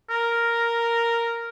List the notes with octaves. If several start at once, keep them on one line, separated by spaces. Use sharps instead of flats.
A#4